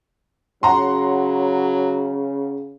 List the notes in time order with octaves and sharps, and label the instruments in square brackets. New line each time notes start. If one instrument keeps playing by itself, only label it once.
[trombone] C#3 [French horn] F#3 [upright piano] F#5 A#5 C6